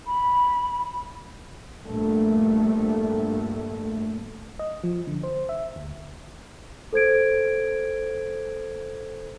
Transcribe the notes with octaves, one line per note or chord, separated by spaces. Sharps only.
B5
A#1 G2 A3
D#5
F3
D3
C5
E5
D2
A4 C5 G#6 D7